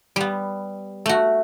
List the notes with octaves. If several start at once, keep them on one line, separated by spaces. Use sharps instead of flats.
G3 B3
A3 F#4